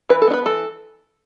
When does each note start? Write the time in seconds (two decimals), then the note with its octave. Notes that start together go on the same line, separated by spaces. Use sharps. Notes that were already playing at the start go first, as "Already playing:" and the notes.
0.09 E3 B4
0.22 A4
0.27 B3 D4
0.33 B4
0.46 E3 A4